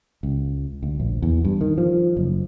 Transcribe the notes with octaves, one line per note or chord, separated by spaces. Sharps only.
C#2
D2
A#1
E2
G2
D#3
F3
F#1